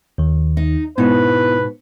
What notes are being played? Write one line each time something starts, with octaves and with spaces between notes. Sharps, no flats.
D#2 D#3
D#4
G#2 B2 B3 E4 B4